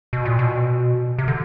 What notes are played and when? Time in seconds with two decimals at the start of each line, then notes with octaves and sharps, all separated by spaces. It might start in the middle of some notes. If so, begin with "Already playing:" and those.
0.13 B2
0.25 A#2
0.39 B2
1.19 C3
1.28 D3